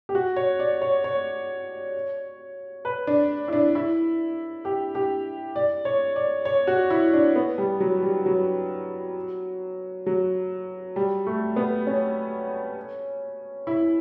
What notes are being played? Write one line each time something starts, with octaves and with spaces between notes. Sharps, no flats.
G4
F#4
C#5
D5
C#5
C#5
B4
D4
E4
D4
E4
G4
G4
D5
C#5
D5
C#5
F#4
E4
D4
B3
G3
F#3
G3
F#3
F#3
G3
A3
B3
C#4
E4